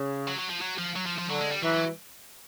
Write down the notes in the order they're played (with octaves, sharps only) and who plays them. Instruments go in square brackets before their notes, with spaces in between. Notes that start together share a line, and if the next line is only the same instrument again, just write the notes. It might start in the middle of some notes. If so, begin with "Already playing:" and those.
Already playing: [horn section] C#3
[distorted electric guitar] F#3
F#3
F3
F#3
F3
F#3
F3
F3
[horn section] D3 [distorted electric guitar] F#3
[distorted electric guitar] G#3
G3
[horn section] E3 [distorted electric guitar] F#3
[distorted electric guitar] F#3